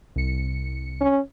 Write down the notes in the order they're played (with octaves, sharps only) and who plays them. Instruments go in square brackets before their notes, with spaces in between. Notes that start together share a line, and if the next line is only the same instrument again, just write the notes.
[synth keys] C2 C#7
[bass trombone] C#4